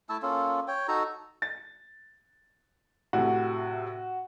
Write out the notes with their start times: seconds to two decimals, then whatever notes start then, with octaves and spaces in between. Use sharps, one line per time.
0.09 A3 E4 A5 E6
0.22 A#3 C#4 F4 A4
0.68 C#5 G5
0.88 D#4 F#4 A4 A#5
1.42 A6
3.13 A2 C3 F#4